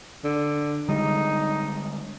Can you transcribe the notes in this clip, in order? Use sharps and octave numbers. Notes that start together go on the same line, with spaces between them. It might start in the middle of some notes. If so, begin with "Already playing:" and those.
D3
D3 G3 G#3 D#4